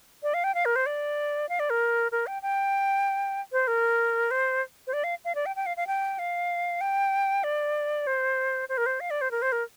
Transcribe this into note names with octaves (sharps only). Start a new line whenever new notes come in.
D5
F5
G5
F5
A#4
C5
D5
F5
D5
A#4
A#4
G5
G5
C5
A#4
C5
C5
D5
F5
F5
D5
G5
G5
F5
F5
G5
F5
G5
D5
C5
C5
A#4
C5
F5
D5
C5
A#4
C5
A#4